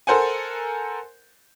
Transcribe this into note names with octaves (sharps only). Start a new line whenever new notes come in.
A4 A#4 C5 F#5 G#5